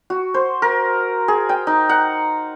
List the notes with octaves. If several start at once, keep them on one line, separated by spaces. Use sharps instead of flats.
F#4
C5
A#4
G#4
G5
D#4
F#5